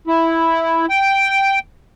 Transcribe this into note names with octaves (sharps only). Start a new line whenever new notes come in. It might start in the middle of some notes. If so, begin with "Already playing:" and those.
E4
G5